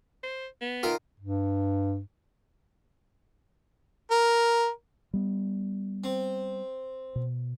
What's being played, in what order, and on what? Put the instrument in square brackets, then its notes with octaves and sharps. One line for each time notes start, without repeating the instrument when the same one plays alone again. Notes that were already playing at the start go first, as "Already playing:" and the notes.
[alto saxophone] C5
B3
[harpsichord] D#3 F4 A#4
[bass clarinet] G2
[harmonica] A#4
[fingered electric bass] G3 B3
[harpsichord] C4
[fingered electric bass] B2